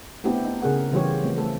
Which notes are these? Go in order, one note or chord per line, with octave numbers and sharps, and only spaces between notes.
A3 B3 C4 D4 E4 G4
D#4
C#3 G#4 A#4 F#5
C#3 E3 G3 F4 G4 C#5
F3 A3 C4
A3 A4